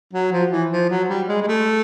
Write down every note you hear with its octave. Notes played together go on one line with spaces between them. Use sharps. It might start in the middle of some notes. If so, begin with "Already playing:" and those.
F#3
F3
E3
F3
F#3
G3
G#3
G#3
A3